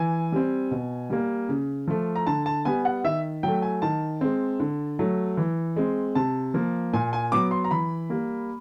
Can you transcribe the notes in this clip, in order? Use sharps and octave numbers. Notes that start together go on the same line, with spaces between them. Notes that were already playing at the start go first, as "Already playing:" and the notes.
Already playing: E3 G#5
G3 C4
B2
G3 A#3
C#3
F3 A3
A#5
D3 A5
A5
G3 B3 G#5
F#5
D#3 E5
F#3 A3 G5
G#5
D#3 A5
G#3 C4
D3
F#3 A3
E3
G#3 C4
C3 A5
F3 A#3
A#2 G#5
G#5
F#3 B3 D6
C6
A#5
E3 B5
G3 A#3